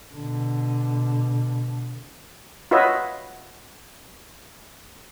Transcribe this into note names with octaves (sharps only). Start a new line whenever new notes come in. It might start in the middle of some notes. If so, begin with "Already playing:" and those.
B2 D3
F4 F#4 B4 C#5 D#5 E5